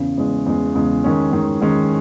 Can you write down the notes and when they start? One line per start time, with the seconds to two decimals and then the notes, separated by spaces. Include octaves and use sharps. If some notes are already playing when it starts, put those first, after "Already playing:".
Already playing: E2 C#3
0.17 E2 C#3 G#3
0.46 E2 C#3 G#3
0.75 E2 C#3 G#3
1.04 D#3 G#3 C#4
1.32 D#3 G#3 C#4
1.61 D#3 G#3 C#4